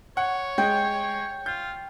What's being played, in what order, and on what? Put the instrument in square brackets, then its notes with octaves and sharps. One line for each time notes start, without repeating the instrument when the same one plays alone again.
[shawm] C#5 [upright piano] F#5
[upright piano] G#3 [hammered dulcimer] G5
[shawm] F4 [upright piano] G6